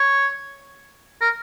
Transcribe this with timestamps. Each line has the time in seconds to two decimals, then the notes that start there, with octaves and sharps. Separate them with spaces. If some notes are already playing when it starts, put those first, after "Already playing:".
Already playing: C#5
1.21 A#4